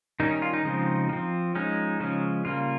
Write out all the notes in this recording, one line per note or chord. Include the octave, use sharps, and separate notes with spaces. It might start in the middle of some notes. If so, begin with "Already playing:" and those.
D#3 G3 C#4 D#4
D#4
F4
D#4
C#3 F3 G#3 C4
F3 C4
F3 G#3 C#4 D#4
C#3 F3 G#3 C#4
C#3 G3 A#3 F4